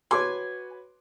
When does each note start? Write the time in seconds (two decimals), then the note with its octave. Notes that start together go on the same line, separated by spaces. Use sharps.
0.11 F#4 B4 C#5 G#5 C6 D6